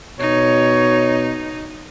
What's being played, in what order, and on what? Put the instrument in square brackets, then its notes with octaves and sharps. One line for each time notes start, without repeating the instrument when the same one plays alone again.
[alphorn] B2 [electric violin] D#4 [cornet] C#5